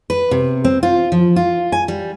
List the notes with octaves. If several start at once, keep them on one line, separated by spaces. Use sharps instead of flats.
B4
C3
C4
F4
F3
F4
G#5
G3